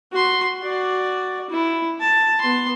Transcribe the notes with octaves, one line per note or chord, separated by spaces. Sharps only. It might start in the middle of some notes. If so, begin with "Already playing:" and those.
F#4 C6
F#4 D5
E4
A5
B3 C6